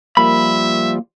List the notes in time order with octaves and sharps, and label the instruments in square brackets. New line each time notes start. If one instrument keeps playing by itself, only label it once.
[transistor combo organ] F3 G3 [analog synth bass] A#3 [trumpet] E5 [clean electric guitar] B5